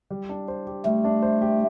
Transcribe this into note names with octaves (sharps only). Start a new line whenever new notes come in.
G3
D4
C5
G4
G3 A3
D4
C5
G4